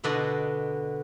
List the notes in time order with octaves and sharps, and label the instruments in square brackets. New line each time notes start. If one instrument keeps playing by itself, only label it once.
[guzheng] B2 D3 B3 D5 D#5 C6